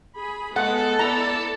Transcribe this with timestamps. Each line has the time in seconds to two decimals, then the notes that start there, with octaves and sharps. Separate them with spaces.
0.19 G#4 B5
0.56 G#3 B3 A4 F#5
0.99 B3 E4 D5 A#5